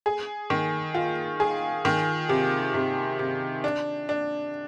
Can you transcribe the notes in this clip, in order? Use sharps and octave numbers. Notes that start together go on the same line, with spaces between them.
G#4
D#3
F4
G#4
D#3
C3
C3
C3
D4
D4